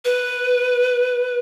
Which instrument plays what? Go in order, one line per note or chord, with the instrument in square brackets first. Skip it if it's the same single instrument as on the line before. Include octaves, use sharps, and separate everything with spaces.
[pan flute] B4